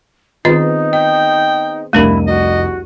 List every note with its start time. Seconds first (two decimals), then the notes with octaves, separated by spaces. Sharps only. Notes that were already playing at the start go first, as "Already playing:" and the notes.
0.45 D#3 B3 C4 D#4 F4 G#4 D#5
0.93 D#5 G5
1.93 F1 C2 A3 D4 E4 A#4 D#7
2.27 F#4 D#5